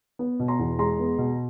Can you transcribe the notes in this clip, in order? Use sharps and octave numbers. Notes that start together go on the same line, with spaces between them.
B3
B2
A#5 C6
E2
G#3 A#5 C6
B3
B2